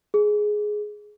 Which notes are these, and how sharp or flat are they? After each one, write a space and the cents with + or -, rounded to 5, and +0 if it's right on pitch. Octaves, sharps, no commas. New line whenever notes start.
G#4 +10